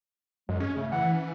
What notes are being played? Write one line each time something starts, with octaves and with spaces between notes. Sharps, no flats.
F#2 G#3
C#4 G#4
C#3 A3
E3 F#5
C#4